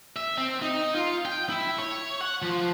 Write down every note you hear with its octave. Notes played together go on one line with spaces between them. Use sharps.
E5
C4
D#4
F4
G5
E4
C#5
F#5
F3